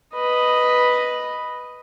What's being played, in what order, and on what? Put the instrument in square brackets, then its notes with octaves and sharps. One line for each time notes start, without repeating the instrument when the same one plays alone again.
[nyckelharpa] B4 D#5